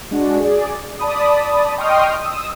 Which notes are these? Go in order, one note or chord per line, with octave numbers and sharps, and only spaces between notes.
G#3 D4 F#4
G#4 D5
D5 A5 B5 D#6
D#5 G5 C6 C#6 D#6 F6
D#6 E6